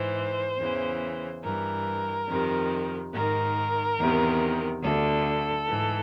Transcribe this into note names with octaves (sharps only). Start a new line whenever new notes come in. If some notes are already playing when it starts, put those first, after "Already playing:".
Already playing: G#2 E3 C5
E2 C#3 E3
G2 E3 A#4
F2 C3 D#3
G#2 D#3 A#4
E2 C3 D#3
D2 D3 A4
G#2 E3